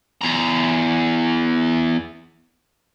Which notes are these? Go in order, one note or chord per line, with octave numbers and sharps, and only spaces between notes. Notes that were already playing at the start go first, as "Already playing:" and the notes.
E2 A#5